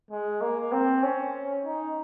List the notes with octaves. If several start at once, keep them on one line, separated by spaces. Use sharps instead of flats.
G#3
A#3
C4
C#4
D#4